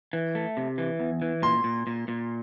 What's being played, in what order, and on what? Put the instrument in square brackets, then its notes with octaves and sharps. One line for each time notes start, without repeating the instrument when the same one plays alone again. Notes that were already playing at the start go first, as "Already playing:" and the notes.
[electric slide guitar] E3
A3
C3
E3
E2
E3
[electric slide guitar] A#2 [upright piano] C6
[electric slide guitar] A#2
A#2
A#2